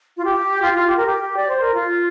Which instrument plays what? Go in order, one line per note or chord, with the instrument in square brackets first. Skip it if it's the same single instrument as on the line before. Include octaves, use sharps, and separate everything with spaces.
[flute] F4
G4
F4
F4
G4
A#4
G4
D5
C5
A#4
F4